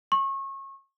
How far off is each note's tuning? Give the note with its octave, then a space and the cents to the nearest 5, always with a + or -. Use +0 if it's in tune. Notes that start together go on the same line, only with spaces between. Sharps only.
C#6 -30